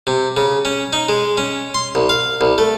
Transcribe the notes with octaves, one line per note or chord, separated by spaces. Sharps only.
C3
C#3
C#4
D#4
G#3
C#4
C6
C2
F5
C2
A3